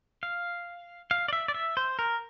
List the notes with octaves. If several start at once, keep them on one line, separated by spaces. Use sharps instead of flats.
F5
F5
D5
E5
D5
E5
C5
A#4